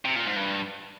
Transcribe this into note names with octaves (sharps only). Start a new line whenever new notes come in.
C3
A#2
G#2
G2